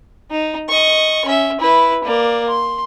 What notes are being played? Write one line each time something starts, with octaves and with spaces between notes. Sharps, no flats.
D#4
D#5 C#6
C#4 E5
E4 B4
A#3 D5
C6